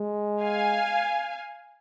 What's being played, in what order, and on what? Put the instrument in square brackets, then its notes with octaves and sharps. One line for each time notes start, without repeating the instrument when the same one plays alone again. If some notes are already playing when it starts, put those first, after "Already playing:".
Already playing: [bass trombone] G#3
[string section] F5 G#5